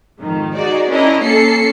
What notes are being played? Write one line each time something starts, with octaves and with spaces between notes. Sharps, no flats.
F2 G#2 D#3
D#4 F#4 G#4 D5
C#4 D4 E4 A#4 D#5
A#3 C#4 A4 C7 C#7